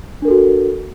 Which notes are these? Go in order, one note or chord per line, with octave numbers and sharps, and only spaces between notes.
D4 F#4 A4 A#4